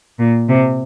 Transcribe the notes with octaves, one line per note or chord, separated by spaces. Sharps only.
A#2
C3